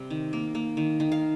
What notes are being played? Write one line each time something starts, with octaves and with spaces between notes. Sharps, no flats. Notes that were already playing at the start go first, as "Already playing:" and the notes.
Already playing: C3 G3 G5
D#3
A#3
A#3
D#3
D#3
F5